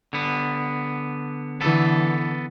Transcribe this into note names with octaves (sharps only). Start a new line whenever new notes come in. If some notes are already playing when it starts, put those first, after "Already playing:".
D3 B3
D3 E3 B3 A4